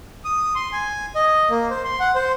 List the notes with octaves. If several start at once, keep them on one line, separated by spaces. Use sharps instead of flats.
D#6
C6
G#5
D#5
A#3
C5
C6
F#5
C5